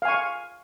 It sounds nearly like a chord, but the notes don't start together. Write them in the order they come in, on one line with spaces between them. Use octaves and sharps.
F5 G#5 C#6